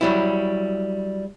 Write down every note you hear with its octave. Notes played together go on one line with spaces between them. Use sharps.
F#3 G3 E4